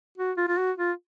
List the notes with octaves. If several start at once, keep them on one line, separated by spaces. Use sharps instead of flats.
F#4
F4
F4
F#4
F4